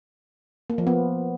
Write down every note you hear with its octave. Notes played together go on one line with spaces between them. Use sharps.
A#3
F3
B3